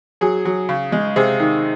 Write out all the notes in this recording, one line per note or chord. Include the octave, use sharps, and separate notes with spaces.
F#3 G#4
F#3
C#3
G#3
C3 G#4
D#3